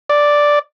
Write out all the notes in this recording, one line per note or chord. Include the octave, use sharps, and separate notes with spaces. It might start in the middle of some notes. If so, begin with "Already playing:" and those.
D5